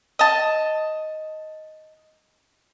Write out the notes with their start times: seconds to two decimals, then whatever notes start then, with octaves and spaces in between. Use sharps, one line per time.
0.19 D#5 A5